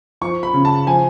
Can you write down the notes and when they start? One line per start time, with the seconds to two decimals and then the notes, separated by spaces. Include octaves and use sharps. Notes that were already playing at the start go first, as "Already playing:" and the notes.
0.21 F3 C#6
0.43 B5
0.54 C#3
0.65 A5
0.87 F3 G#5